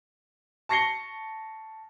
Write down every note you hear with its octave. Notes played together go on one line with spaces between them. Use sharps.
A5 C#6 A#6 C7 C#7 G7